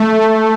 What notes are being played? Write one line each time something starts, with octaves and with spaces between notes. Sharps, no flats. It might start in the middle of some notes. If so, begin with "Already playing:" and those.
Already playing: A3